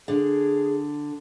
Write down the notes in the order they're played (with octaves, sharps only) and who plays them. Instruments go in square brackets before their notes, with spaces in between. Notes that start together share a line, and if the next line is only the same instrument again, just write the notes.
[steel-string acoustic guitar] D3 [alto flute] G#4